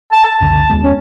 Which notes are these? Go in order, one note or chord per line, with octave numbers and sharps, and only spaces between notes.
A5
A5
F#1 C#2 D3
D#2 G#3 B3
C#4